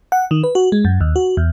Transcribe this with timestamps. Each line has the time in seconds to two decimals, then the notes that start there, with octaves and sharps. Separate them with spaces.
0.12 F#5
0.31 D#3
0.44 B4
0.55 F#4
0.72 G#3
0.85 F#2
1.01 D#2
1.16 F#4
1.37 E2